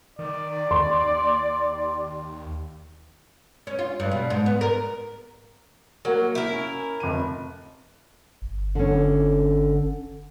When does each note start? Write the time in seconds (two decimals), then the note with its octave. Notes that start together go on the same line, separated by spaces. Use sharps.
0.19 D#3 D5
0.71 D#2 C6
3.67 C#4
3.79 F4
4.00 G2
4.11 B2
4.30 G#2
4.46 B3
4.61 A#4
6.05 F#3 A#3 F#4 A#4
6.35 E4 A#4
6.51 C#4
7.00 F1 D#7
8.42 G1
8.75 D3 C#4